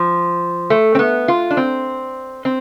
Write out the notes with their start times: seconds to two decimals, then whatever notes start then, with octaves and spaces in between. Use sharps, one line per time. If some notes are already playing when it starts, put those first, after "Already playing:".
Already playing: F3
0.70 A3
0.95 C4
0.99 B3
1.28 F4
1.51 D4
1.57 C4
2.45 C4